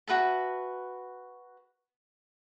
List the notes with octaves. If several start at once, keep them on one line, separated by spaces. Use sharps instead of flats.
F#4 B4 E5 A5